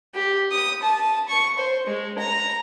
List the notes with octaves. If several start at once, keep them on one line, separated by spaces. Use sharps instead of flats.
G4
D#6
A5
C#6
C5
G#3
A#5